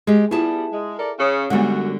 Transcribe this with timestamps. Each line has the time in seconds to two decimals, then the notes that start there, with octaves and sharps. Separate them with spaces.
0.07 G#3 G4 G#4
0.31 G3 B3 E4 F4 G#4 E5 A5
0.72 G#3
0.98 A4 A#4 D5
1.19 C#3
1.50 F#2 D3 G3 G#3 B3 F#4